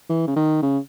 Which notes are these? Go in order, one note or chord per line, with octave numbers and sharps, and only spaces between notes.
E3
C#3
D#3
C#3